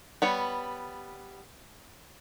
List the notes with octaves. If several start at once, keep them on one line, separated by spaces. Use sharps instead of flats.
G3 B3 C#5